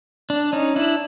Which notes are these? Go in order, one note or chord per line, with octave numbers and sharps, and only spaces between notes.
D4
C#4 D#4
D4 E4